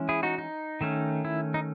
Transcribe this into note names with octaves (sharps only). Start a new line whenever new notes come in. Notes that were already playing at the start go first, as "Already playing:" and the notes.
Already playing: E3 G#3 C#4
E4 G#4
D#4 F#4
D#4
D#3 A3 C#4
E4
D#4